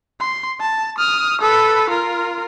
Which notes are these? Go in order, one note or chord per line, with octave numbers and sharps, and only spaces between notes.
C6
A5
D#6 F6
A4 B4
F4 A#4